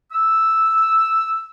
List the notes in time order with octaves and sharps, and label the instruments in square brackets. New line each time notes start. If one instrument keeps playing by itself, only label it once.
[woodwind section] E6